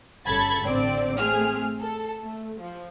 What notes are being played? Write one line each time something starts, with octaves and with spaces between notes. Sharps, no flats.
G1 C#3 A4 B5 G#6 A6
A1 D3 C4 D5
A3 C4 G#4 F6
A4
A3
F3